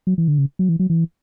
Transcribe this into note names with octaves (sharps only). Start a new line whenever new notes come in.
F#3
E3
D3
C#3
F#3
E3
F#3
E3